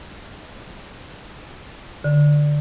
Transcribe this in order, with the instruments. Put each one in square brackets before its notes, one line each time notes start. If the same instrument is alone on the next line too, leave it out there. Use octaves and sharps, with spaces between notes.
[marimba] D3